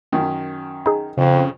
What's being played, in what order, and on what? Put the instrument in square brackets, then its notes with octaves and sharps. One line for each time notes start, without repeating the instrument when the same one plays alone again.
[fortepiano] F#2 D#3
[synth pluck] D#4 G#4
[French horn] F2 [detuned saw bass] C#3